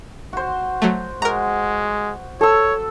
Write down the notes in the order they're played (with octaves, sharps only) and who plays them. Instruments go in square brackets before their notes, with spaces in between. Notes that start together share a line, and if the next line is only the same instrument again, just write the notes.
[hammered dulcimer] F#4 C5
[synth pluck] F#3 A3
[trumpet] G#3 [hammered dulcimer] F#4 [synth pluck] A#4 A#5
[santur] A4 E6 [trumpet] C#5